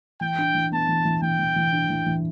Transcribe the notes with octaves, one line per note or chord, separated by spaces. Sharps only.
E3 G5
D4
E3
B3 A5
E3
E3
E3 G5
E3
E3
D4
E3
E3